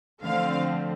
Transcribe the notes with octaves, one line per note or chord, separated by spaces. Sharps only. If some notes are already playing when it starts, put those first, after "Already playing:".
D3 F3 A3 C4 F5